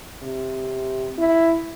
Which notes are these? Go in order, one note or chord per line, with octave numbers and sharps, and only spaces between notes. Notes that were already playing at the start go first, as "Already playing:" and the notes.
C3
E4